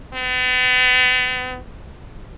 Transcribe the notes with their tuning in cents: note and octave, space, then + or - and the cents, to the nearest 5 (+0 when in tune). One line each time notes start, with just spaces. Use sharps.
B3 +40